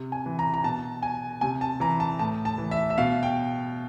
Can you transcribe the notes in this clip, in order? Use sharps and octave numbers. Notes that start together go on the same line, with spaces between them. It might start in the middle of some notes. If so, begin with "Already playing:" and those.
Already playing: C3
G#5
E3
A#5
A#5
B2 A5
G#5
C3 G#5
A5
E3 A#5
A5
A2 A5
A5
E3
E5
E5
B2 F5
G5